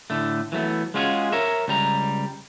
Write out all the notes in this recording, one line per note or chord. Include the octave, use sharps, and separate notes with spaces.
A2 D3 A3
E3 F#3 A3 B3
G#3 C#4 F4 F#4 G#4
A#4 C#5 E5
C#2 G3 A#5